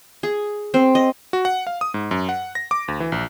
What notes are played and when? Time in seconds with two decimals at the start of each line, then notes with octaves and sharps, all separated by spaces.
0.23 G#4
0.74 C4
0.95 D#5
1.33 F#4
1.45 F#5
1.67 F5
1.81 D#6
1.94 G#2
2.11 F#2
2.29 F#5
2.55 A#6
2.71 D6
2.88 D2
3.00 E3
3.12 A#1